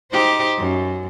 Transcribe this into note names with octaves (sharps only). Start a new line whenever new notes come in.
D#4 G4 C5
F#2